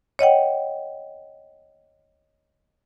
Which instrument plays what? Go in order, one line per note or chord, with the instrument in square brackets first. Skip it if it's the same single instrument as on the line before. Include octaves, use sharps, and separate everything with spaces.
[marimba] C#5 D#5 F#5 G5